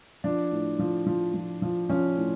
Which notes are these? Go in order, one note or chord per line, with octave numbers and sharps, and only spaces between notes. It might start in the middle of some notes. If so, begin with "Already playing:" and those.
F3 D4
A2
F3
F3
F3
F3
F3 C#4
A2